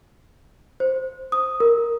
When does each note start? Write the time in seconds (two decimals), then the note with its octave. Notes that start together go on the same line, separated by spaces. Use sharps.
0.80 C5
1.32 D#6
1.60 A#4